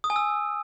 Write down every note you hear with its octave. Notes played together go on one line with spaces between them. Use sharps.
D#6
G#5
E6